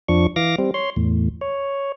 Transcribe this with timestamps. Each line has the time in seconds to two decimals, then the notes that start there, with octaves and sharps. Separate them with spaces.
0.08 F2 F3 D4 C#6
0.36 E3 F5 D6 A#6
0.58 G3 C4
0.74 C#5 C6
0.96 E2 A2
1.41 C#5